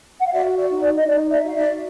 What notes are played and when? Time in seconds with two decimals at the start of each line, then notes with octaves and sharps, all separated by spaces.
0.19 F#5
0.27 F5
0.33 F#4 D5 E5
0.58 D5
0.70 D#4
0.82 D5
0.97 D#5
1.07 D#4 D5
1.31 D5 E5
1.44 F#4 F5
1.56 D5 E5